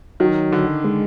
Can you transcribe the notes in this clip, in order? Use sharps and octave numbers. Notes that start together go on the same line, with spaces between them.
D#3 F#3
D3
G#3